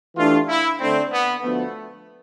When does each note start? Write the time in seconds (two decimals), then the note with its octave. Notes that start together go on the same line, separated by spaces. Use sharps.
0.17 E3 A3 D4 F4 G4
0.48 E4
0.79 D3 A3 C4 D4
1.11 B3
1.43 D2 D3 F3 A3 B3